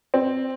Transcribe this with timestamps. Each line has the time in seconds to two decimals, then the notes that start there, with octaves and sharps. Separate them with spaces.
0.14 C4